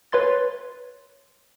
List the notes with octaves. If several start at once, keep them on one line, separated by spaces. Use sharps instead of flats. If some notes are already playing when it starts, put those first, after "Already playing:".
B4 C#5 C6 A6